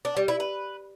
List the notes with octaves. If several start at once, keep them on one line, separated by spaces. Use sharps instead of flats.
D4
G3
E4
B4